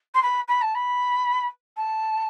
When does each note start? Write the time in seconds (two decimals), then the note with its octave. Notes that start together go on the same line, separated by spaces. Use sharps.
0.14 C6
0.22 B5
0.48 B5
0.61 A5
0.75 B5
1.76 A5